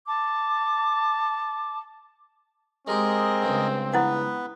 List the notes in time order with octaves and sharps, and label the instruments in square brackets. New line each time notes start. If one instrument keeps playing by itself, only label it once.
[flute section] A5 D6
[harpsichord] G#3 G4 [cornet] C4 [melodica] G#4 A#4 D#5
[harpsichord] C#2 G2
[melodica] B3 B4 [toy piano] E4 F#5